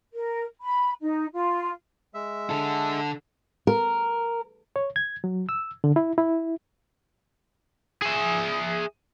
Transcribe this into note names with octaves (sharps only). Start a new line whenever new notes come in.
A#4
B5
D#4
F4
G#3 E5
D3 A4
A#4
C#5
G#6
F#3
E6
D3
E4
E4
G#4 E5